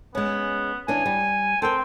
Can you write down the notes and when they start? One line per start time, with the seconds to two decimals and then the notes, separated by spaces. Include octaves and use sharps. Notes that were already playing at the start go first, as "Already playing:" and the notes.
0.15 G#3 B3 C#4
0.88 E3 C#4 D4 G#5
1.06 G3
1.62 C4 A4 A#4 G5